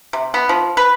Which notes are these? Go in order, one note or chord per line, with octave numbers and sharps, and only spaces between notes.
C3
B3
F3
B4